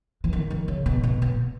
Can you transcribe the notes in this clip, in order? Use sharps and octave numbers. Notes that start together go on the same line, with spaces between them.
E3
D#3
D#3
C#3
B2
B2
B2